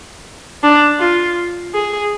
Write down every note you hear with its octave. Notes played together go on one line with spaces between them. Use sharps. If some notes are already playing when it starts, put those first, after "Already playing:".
D4
F4
G#4